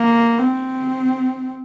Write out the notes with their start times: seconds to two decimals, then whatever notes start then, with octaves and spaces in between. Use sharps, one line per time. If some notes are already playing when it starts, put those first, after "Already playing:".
Already playing: A#3
0.38 C4